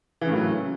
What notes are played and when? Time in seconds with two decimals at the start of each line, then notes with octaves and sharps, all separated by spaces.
0.21 E3
0.25 C#3
0.29 A2
0.32 A#3
0.36 F#3